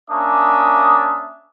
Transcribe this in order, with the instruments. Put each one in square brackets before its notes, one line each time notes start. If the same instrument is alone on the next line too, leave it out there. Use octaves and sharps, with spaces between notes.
[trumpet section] A#3 C#4 D4 E5 D6 D#6